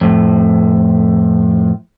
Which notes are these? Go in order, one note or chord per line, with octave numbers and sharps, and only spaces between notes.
F2 A2